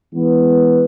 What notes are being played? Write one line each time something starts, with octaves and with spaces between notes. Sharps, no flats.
E3 G#3 B3